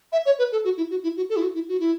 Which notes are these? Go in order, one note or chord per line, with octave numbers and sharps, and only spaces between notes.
E5
C#5
B4
A4
F#4
E4
F#4
E4
F#4
A4
E4
F#4
E4
F#4
E4